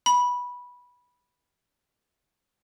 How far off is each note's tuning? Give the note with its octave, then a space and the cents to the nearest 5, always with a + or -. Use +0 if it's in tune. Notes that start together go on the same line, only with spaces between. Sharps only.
B5 -10